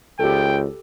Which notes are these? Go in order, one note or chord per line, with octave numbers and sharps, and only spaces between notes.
C#2 G4 A4 G5